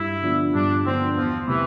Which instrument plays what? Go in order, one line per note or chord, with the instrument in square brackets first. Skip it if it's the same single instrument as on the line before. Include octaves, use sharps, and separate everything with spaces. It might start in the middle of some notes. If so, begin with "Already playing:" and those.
Already playing: [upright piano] G2 [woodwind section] E4
[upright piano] D3 F3 B3 D4
[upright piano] G2 [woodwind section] D4
[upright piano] D3 F3 B3 D4 [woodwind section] C4
[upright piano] E2 [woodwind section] F3
[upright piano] C3 [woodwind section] E3